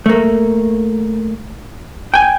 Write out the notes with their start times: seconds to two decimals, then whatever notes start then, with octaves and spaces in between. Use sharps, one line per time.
0.06 A3 A#3
2.14 G5 G#5